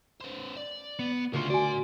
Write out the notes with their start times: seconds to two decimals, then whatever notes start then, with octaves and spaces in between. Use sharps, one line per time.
0.21 B3 C5
0.57 D5
0.99 B3
1.34 D2 C#3 F4 A#4 C6
1.50 F#4 D5 G#5